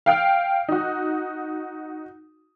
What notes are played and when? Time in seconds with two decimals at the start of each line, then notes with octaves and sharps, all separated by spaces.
0.06 F5 G5 F6
0.68 D#4 F#4